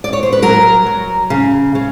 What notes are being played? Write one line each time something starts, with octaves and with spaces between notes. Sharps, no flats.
D5
C#5
C5
B4
F#3 A#4
F#3
C#3
C#3